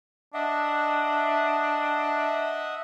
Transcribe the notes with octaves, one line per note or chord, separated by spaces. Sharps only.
D4 D#5 E5 F#5